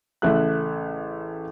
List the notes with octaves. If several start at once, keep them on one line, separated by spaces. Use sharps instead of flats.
A1 C#3 A3 E5 F#6